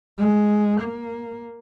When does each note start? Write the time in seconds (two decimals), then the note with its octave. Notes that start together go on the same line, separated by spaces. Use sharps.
0.18 G#3
0.81 A#3